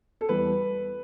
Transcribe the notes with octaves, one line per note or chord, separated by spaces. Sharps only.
A4
E2 E3 G3 B4